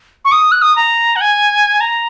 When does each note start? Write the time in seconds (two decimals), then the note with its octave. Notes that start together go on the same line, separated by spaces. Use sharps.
0.25 C#6
0.32 D#6
0.52 F#6
0.62 D#6
0.76 A#5
1.16 F#5
1.21 G#5
1.81 A#5